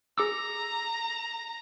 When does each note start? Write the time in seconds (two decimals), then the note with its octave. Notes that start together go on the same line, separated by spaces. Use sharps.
0.18 G#4 A#5 D6 E6